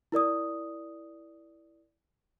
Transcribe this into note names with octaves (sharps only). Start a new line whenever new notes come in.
E4 A#4 D5 D#6